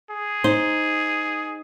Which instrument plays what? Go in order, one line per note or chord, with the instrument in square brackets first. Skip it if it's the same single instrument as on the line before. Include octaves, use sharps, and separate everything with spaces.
[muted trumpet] G#4
[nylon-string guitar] D#4 C5